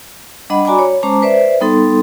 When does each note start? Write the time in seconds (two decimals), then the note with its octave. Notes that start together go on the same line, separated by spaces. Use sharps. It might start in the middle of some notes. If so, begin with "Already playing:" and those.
0.50 G3 D4 D#5 F#5 B5
0.65 F#4 D5 G#5 A#5 B5 D6
0.79 C#5
1.03 G#3 C#4 C5 A5 A#5 D6
1.22 B4 C5 D5 E5
1.61 G3 B3 D#4 A4 C6